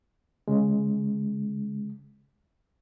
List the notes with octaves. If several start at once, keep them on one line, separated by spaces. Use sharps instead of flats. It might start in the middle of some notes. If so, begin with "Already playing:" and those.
C#3 G#3